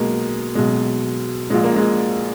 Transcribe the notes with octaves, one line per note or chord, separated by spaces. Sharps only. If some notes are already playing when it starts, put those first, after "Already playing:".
Already playing: B1 B2 G#3 A#3
B1 B2 G#3
A#1 A#2 G#3
A#3
G#3